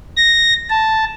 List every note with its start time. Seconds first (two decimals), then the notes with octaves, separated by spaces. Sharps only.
0.17 A#6
0.70 A5